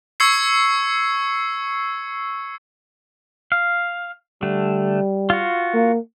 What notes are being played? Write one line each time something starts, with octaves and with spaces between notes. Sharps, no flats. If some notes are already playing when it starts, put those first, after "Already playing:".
C#6 E6 G#6 C7 C#7
F5
D3 G3 A3
F4 F#4
A#3